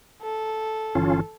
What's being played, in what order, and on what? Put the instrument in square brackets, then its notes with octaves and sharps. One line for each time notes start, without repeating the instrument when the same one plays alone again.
[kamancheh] A4
[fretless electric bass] G1 E3 [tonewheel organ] C#4 F4